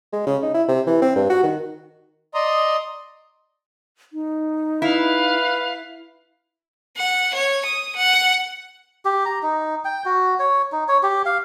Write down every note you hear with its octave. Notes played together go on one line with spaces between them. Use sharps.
G#3
C#3
D#4
E4
C3
E3
C4
G2
F#4
D#3
D5 D#5 A#5 C6 D#6
D#4
E4 B4 F5
F#5
C#5
D#6
F#5
G4
A#5
D#4
G5
F#4
C#5
D#4
C#5
G4
F5